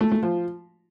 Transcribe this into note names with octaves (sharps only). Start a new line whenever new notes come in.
A3
A3
F3